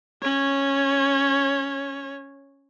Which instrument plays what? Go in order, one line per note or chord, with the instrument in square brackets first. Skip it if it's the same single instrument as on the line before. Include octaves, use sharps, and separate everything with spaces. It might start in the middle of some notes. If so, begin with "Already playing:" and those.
[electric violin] C#4 C#5